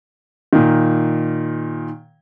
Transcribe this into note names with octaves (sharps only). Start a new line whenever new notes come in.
A#2 D#3